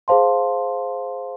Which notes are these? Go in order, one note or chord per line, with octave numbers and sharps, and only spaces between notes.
G#4 C5 F5 A5 C6